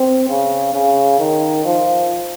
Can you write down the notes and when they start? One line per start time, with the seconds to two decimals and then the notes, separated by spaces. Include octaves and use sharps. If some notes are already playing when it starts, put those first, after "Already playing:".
Already playing: C4
0.29 C#3
0.74 C#3
1.19 D#3
1.65 F3